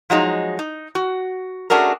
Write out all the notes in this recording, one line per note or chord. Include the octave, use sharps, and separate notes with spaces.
F3 F#3 G#3 D#4
D#4
F#4
A3 C#4 D4 F#4 G#4 A#4